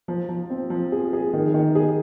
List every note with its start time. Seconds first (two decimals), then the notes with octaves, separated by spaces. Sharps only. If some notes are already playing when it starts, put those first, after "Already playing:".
0.08 F3
0.29 F3
0.50 C4
0.70 F3
0.92 G#4
1.13 G#4
1.33 D#3
1.54 D#3
1.75 G#4